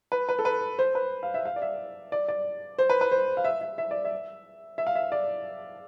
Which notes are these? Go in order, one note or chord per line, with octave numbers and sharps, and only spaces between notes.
B4
B4
A4
B4
C5
B4
F5
E5
F5
D5
E5
D5
D5
C5
B4
B4
C5
F5
E5
E5
E5
D5
E5
E5
F5
E5
D5